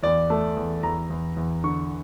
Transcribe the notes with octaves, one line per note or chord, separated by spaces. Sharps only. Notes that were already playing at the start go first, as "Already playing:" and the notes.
E2 D5
A3
E2
E2 A#5
E2
E2
D3 C#6